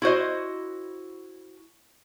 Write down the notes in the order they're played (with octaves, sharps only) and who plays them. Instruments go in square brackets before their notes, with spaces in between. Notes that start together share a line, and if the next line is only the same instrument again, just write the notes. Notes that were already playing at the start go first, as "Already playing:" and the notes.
[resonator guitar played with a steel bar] E4 F#4 C5 D#5